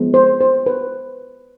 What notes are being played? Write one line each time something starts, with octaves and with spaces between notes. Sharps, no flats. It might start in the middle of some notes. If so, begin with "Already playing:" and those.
Already playing: F3 G#3 B3
C5
C5
B4